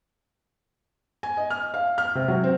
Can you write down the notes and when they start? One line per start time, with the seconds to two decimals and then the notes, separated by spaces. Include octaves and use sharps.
1.23 G#5
1.37 D#5
1.50 F6
1.74 F5
1.98 F6
2.15 C3
2.28 F#3
2.44 C4